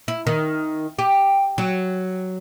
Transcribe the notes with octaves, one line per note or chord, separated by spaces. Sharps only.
E4
D#3
G4
F#3